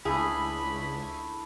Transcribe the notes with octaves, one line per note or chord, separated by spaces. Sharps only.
C#2 A3 D4 E4 G#4 B5